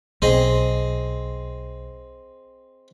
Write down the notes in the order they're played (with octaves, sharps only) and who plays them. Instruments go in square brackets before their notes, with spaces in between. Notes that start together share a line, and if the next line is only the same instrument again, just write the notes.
[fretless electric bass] B1 [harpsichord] C4 G#4 D#5